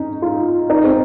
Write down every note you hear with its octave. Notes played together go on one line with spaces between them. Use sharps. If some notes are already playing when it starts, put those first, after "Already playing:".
Already playing: C#4 D#4
F4
D#4
C4